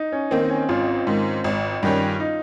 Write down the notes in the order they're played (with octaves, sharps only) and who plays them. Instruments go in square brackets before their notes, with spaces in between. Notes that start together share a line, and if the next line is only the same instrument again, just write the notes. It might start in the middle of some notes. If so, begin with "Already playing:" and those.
Already playing: [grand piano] D#4
C#4
[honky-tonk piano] D#3 A#3 [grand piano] C4
[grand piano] C#4
[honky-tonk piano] G#1 [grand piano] F4
[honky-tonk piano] G#2 D#3
G#1
G2 D#3 G3 C#4
[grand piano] D#4